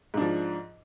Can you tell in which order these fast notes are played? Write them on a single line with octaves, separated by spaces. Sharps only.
G#2 D4 F3